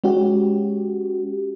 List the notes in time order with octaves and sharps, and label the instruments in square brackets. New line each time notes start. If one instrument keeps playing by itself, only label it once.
[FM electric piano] G#3 C#4 F#4 G4